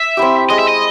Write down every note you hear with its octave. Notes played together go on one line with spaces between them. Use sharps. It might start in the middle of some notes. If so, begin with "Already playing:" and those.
Already playing: E5
C4 E4 G4
G#3 D#5
E5
D#5